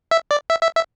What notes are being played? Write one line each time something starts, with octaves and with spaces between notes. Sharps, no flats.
E5
D5
E5
E5
E5